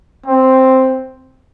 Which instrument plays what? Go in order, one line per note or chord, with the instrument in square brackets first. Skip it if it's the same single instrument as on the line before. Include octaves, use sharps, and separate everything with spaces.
[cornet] C4